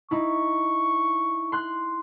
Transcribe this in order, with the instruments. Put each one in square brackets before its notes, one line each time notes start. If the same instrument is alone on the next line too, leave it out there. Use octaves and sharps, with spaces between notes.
[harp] D#4 E4 [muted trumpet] C#6
[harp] C6 F#6